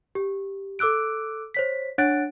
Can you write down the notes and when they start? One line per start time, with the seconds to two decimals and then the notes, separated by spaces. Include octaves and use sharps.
0.15 G4
0.79 A4 D6 E6 F#6 D7
1.54 C5 C#5 B6
1.98 D4 C#5 F#5 F#6 A6 D7